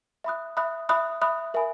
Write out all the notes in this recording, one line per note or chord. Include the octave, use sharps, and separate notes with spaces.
E5 B5 D#6 F#6
E5 B5 D#6 F#6
E5 B5 D#6 F#6
E5 B5 D#6 F#6
A#4 E5 G#5 B5